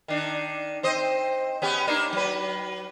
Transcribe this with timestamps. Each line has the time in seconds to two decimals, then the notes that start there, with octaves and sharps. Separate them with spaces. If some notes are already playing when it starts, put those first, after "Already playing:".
0.08 D#3 D4
0.83 C4 C5 D#5
1.62 B3 C#4 G4
1.87 A#3 D4 D#4
2.13 F#3 B4